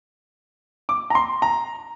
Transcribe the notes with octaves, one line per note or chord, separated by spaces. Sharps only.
D6
A#5
C6
A#5